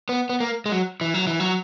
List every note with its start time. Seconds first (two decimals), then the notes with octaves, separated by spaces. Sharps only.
0.09 B3
0.29 B3
0.40 A#3
0.66 G#3
0.71 F#3
1.01 E3
1.14 F#3
1.27 E3
1.40 F#3